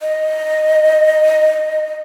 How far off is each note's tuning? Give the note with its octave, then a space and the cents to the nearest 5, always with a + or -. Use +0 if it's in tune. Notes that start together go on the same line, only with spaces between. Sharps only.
D#5 -5